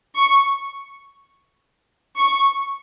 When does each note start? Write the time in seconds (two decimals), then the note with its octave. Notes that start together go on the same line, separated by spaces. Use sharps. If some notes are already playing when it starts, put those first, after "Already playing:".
0.15 C#6
2.16 C#6